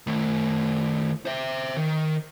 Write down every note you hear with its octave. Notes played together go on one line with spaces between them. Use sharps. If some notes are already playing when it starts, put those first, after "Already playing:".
D#3 A3
C5 E5
D#3